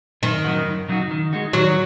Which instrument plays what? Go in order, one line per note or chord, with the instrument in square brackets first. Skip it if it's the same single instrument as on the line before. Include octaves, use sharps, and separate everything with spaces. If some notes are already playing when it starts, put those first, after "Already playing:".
[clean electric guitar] F#2 [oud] D#3
[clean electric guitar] C#3 F#3 D#4 F#4
F#2
C#3 F#3 D#4 F#4
D#3
G#3 D#4 F#4
[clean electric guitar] D#3 [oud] F#3